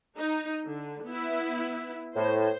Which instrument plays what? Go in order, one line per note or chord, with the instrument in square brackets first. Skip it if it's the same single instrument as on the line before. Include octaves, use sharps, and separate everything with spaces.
[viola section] D#4
D3
B3 E4
[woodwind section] A2 [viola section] C5